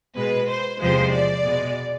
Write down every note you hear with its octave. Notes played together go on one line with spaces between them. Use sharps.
B2 G#3 B4
C5
E2 C3 F3 G#3 C5
D5
B2 G#3